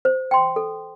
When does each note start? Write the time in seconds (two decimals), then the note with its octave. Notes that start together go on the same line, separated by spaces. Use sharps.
0.05 C5
0.31 G5 C6
0.56 A4